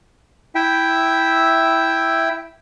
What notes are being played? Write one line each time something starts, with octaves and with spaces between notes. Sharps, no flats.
E4 E5 G5